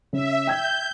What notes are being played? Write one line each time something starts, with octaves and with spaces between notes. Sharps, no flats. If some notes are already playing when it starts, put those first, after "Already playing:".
C#3 E5
G5 G6 G#6